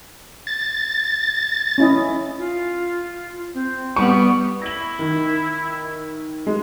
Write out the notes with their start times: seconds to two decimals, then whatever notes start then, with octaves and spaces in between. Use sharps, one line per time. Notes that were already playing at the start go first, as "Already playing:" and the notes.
0.47 A6
1.78 C#4 E4 D#5
2.39 F4
3.54 C4
3.96 G3 B3 C#6
4.62 E4 A#6 F#7
4.99 D#3
6.47 G#3